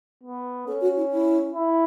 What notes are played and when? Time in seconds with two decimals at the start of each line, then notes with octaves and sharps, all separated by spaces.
0.23 B3
0.67 C#4 A4
0.81 F#4
0.97 E4
1.11 E4
1.54 E4